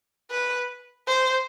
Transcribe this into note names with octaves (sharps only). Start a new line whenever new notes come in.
B4
C5